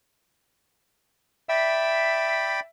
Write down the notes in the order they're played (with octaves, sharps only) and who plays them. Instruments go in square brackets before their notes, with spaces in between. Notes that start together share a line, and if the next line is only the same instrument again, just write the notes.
[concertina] D5 G5 B5 [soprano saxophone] E5